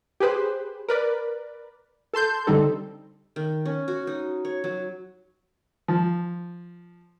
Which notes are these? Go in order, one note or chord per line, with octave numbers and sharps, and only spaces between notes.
G4 G#4 B4 C5
A#4 B4 D5
A4 A5 C6 G6
D3 G3 C4 D#4 A4
D#3
C#4
F#4
D#4
C#5
F#3
F3